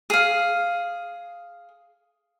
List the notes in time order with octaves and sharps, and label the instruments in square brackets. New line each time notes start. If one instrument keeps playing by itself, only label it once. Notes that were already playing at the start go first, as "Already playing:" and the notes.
[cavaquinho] G#4 F5